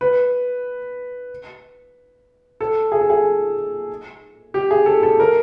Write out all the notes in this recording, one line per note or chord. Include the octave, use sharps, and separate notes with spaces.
B4
A4
G#4
A4
G#4
G4
G#4
A4
A4
A#4